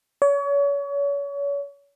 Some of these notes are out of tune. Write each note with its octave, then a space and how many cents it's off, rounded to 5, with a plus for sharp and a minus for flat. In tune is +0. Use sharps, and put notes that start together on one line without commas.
C#5 +35